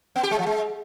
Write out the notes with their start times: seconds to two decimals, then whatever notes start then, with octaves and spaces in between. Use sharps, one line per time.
0.16 B3
0.23 G4
0.31 G#3
0.39 F3
0.46 G#3